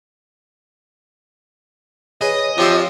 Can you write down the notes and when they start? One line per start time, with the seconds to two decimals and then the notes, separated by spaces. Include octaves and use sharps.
2.21 G#4 B4 C#5 D#5
2.58 F3 C4 D4 G4 C#5 E5